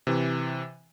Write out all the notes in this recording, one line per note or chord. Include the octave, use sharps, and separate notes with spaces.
C3 E3